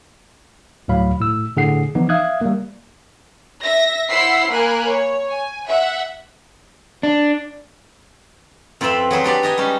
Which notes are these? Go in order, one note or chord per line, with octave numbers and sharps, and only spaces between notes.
D2 A2 F#3 F5 B5
A2 E6
A2 D3 G#4 F#5 C7
E3 F3 B3 D#4
E5 F5 D#6 F#6 G#6
G3 A#3
E5 A#6
E4 C5 F#5 E6 B6 C7
A#3 A#4 G#5 B5 F#6
C#5
G#5
E5 F#5
D4
F2 F3 C4 B4 E5 B5
F#3 G#4 B4 C5
D4 G4 B4 D5
D#4 D#5 G#5
G3 G#3 C#4 D#4